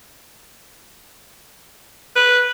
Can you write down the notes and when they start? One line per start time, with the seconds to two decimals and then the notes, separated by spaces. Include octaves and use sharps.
2.16 B4